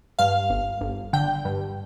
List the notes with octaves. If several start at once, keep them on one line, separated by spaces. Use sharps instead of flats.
G2 F5
G1
G1
D3 G5
G2